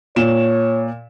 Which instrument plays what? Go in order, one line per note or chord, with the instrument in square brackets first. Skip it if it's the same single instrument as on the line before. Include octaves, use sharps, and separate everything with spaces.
[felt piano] A#2 E7 [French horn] C#5